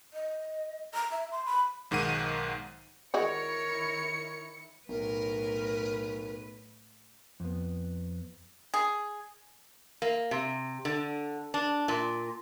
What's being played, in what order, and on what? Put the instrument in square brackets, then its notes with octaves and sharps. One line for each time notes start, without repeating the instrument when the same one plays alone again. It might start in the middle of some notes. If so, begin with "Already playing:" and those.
[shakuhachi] D#5
A#5
E5
C6
B5
[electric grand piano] B1 G#2 D#3 F#5 D#7
[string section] D#3 E4 C#7 [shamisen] G#3 F#4 D5 [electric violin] A#4 C#5
[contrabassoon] B1 [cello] A2 B4 [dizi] A#4
[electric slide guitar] F2 B3
[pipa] G#4
[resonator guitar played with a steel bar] A#3
C3
D3
D4
A#2